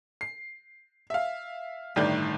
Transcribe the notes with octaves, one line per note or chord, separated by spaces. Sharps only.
C7
E5 F5
G1 A2 D#3 D5 G6